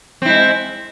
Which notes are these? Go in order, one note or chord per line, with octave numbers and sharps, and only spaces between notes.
G#3 C4 E4